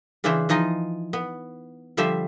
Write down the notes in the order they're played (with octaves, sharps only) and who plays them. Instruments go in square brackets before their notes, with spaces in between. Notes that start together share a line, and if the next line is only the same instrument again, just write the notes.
[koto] C#3 E3 D4 E4 C5
E3 F3 D#4 F4 D#5
B3
D3 F3 G3 C5 E5